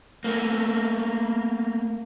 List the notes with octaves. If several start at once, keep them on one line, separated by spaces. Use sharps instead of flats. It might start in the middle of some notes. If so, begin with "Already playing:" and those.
A3 A#3